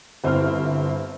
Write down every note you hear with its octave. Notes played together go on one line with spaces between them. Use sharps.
G1 C4 E4 F6